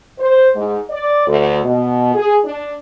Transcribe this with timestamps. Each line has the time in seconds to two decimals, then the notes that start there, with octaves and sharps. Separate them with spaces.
0.18 C5
0.55 G#2
0.90 D5
1.27 D2
1.64 B2
2.14 G#4
2.45 D4